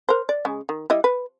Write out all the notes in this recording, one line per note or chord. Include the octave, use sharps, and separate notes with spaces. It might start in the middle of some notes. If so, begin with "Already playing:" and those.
A#4 C5
D5
C#3 G#3
D#3
G3 E4 D#5
B4